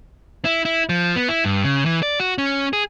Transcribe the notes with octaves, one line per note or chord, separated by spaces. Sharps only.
E4
E4
F3
B3
E4
G2
C#3
E3
D5
F#4
C#4
G#4